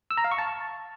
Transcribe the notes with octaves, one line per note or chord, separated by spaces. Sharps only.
E6
A#5
F5
C#6
A5